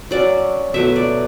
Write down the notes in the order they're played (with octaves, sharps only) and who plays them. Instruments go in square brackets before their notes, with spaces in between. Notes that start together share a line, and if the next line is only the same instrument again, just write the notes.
[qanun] F#3 C#4 D5
B2 F#3 A3 E5
D5